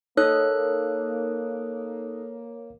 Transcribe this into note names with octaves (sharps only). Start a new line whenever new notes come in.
A#3 D#4 A4 C#5 F#6